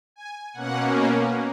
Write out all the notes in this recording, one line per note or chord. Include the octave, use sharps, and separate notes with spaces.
G#5
B2 A#3 C#4 F#5